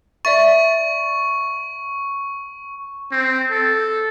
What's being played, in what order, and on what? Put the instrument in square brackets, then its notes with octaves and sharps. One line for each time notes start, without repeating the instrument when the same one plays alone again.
[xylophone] D5 E5 A6 [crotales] C#6
[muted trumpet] C4
A4